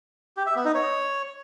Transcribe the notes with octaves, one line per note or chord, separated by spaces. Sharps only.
G4
E5
B3
D#4
C#5